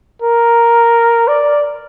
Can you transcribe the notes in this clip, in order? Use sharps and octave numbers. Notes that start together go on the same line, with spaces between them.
A#4
D5